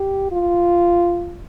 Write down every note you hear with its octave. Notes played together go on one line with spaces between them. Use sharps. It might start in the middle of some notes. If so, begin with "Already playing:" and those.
Already playing: G4
F4